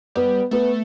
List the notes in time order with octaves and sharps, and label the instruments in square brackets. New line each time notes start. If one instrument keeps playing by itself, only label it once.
[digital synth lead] G3 [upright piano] B3
[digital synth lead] A3 [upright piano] B3